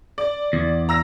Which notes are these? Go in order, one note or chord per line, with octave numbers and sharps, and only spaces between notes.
D5
E2
A#5 E6 A#6